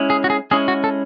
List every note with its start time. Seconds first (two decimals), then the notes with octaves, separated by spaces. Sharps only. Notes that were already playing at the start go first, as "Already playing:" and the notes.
Already playing: G#3 C#4 E4
0.10 G#4
0.24 F#4
0.30 G#4
0.51 G#3 C#4 E4 G#4
0.68 F#4
0.84 A4